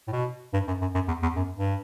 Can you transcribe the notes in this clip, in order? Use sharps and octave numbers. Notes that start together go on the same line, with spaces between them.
A2
B2
G2
F#2
F#2
F#2
E2
E2
F#2
G2